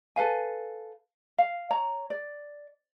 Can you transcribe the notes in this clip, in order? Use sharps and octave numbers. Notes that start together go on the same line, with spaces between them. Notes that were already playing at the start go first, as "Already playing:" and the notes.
A4 B4 F5 G#5
F5
C#5 A#5
D5